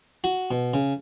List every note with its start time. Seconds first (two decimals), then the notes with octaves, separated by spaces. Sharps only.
0.24 F#4
0.51 B2
0.74 C#3